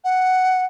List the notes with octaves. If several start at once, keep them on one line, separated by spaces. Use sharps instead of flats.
F#5